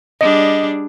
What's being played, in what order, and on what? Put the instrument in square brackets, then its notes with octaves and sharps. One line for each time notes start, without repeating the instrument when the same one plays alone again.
[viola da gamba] G3 D4 G#4 [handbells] D#5